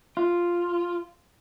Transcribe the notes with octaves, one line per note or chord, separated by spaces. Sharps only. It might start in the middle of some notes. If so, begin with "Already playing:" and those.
F4